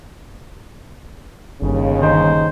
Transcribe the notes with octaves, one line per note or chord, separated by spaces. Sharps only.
G1 D#2 C#3
D#3 D#4 C5